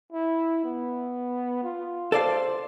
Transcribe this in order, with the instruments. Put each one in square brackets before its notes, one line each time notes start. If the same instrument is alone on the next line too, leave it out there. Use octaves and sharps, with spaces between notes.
[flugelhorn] E4
B3
F4
[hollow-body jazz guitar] A4 D5 F5 [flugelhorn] C5